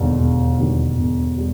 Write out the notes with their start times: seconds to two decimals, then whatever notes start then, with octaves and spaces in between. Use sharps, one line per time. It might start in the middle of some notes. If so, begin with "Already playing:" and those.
Already playing: E1 D#2 D3 G3
0.18 E1
0.59 D#2 D3 G3
0.97 E1
1.38 G3